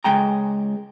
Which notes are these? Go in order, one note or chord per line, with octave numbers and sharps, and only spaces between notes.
C#2 G#3 G5 A#5